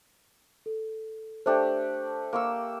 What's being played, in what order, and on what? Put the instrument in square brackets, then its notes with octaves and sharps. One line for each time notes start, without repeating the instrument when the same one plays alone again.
[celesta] A4
[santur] A3 D4 G4 [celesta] C5
[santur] A#3 C#6 E6